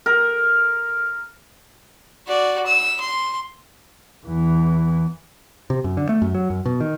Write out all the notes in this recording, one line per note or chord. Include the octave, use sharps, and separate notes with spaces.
A#4
F#4 D5
E6
C6
E2 E3
C3
F#2
D3
A3
F#2
F#3
F#2
B2
D#3